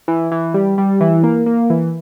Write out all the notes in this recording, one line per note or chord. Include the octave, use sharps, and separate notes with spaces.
E3
E3
G3
G3
E3
A#3
A#3
E3